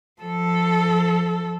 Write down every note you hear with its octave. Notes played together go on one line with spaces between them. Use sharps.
F3 A4